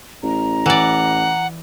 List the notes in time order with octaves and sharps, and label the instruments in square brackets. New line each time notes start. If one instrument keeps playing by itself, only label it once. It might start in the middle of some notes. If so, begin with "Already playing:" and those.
[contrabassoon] A1 [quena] A#5
[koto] E3 D5 [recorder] F#5